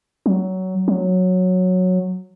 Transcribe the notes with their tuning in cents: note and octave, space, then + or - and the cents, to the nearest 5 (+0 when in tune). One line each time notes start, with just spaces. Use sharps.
F#3 +15
F#3 -10